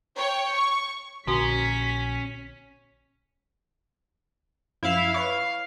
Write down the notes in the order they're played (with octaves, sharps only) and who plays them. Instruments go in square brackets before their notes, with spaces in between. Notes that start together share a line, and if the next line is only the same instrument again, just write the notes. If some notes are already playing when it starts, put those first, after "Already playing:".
[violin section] C#5 G5
C#6
[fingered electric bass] A#1 [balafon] D3 F#4 A#5 [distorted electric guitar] C#4 [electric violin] B6
[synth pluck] F#2 F3 [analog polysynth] E4 E5 F5
[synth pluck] B4 C#5 C#6 [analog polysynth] F5